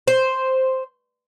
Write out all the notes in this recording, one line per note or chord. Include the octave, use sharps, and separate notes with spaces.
C5